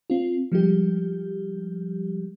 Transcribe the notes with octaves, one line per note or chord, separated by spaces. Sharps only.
C4 F4
F3 G3 G#3 G4